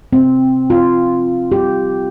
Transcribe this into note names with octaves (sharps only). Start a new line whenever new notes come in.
C4
F4
G4